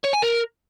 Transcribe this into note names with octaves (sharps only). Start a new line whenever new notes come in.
C#5
G#5
A#4